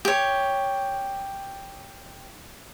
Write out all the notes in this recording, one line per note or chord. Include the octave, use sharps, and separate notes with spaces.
G4 C#5